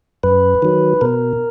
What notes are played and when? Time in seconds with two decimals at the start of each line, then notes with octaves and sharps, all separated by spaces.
0.23 F#2 B4
0.62 D#3 F#3
1.01 B2 A#4